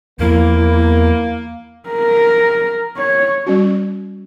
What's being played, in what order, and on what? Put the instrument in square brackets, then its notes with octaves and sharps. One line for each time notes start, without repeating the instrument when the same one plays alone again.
[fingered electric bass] E2 F3 [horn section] A#3 [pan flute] E4
[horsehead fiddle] A#4
C#5
[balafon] G3 C#4 F#4